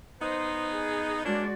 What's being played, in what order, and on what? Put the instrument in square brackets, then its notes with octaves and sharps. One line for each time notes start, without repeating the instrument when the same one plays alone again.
[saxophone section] B3 D#4 [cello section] C5
[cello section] G#4
[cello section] G#3 F#4 D5 [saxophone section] A#3 C#4 D4